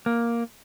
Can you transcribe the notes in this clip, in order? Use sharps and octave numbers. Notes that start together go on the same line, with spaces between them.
A#3